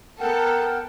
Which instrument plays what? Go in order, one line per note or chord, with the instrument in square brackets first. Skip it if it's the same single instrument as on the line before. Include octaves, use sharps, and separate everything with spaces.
[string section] B3 A4 [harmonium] A#4 F#5 G5